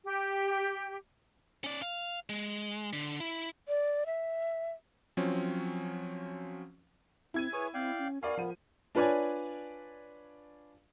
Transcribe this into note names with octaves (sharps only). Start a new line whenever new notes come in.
G4
C#4 D5
F5
G#3
D3
E4
D5
E5
F3 F#3 C4 C#4
C4 E4 G#6 D#7
G#4 B4 C#5 G#5
C4 D5 F5 G5
C#4
B3 F#4 A#4 D5 F5 G#5
F3 B3 D#7
D4 F4 B4 C#5 D5 G#5